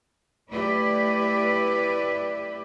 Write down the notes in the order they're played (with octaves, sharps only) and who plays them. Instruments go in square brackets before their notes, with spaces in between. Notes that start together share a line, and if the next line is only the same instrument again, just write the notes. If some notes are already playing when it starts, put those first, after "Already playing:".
[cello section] A3 E4 G4 B4 D5